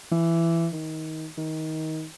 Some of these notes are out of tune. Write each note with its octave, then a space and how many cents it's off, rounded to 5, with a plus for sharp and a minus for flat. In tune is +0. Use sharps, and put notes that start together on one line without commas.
E3 +15
D#3 +20
D#3 +20